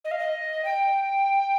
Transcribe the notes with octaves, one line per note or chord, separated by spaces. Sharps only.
D#5
F5
D#5
G5